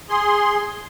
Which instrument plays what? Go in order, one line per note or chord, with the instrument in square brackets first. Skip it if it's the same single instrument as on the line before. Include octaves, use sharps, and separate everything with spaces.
[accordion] G#4 C6